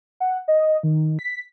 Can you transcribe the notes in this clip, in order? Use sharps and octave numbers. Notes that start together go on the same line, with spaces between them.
F#5
D#5
D#3
B6